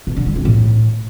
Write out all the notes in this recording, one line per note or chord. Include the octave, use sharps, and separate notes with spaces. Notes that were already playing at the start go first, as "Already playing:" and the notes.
B2
D3
G3
C3
A2